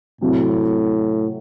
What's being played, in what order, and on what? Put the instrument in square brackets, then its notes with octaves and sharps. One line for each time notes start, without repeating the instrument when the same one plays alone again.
[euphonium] A2 [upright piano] C3 F#3 C4 E4